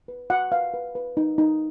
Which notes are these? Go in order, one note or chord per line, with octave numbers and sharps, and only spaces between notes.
B4
F#4 F#5
B4 F5
B4
B4
D#4
D#4